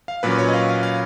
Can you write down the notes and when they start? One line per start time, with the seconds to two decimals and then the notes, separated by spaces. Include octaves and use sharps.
0.08 F5
0.23 A#2 F#3 C#4 B4
0.38 C#5
0.48 D#5
0.53 F5
0.69 F5
0.83 F5